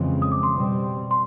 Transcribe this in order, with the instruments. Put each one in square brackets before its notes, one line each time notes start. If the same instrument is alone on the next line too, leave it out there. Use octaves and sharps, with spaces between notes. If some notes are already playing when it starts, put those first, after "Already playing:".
Already playing: [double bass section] F2 C#3 E3 G#3 C4
[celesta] D#6
D6
C6
[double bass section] B2 G3 C4
[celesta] C6